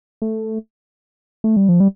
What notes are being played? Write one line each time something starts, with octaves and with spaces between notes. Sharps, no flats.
A3
A3
G3
F3
G3